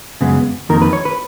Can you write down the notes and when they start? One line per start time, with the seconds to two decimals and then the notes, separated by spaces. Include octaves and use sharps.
0.21 F#2 C#3 G#3 B3
0.69 F2 D#3 A#3 A#4
0.82 B4
0.93 C#5
1.05 B4